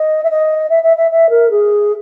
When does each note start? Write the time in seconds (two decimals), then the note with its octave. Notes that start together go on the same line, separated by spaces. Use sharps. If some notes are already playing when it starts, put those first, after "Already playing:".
Already playing: D#5
0.24 E5
0.30 D#5
0.70 E5
0.83 E5
0.97 E5
1.11 E5
1.30 A#4
1.50 G#4